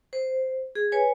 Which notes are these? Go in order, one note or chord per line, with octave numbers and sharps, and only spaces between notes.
C5
G#4
B4 C#5 G#5